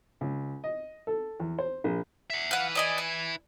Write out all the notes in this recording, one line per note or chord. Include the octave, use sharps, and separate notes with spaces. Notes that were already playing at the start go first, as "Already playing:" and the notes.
C#2
D#5
A4
E2
C5
A#1
E5 F#5
E4 B4 F5 F#5
D5 D#5 G#5
G#5